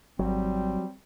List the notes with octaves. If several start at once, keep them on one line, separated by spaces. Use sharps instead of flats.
G#1 F#3 G3 C4